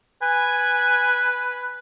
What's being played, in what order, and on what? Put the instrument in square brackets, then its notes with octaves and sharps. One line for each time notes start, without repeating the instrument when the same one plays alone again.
[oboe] B4 [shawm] G#5